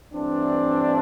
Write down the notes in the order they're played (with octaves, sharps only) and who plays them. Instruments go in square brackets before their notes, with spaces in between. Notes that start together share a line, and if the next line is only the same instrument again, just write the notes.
[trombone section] G2 E3 A3 C4 D4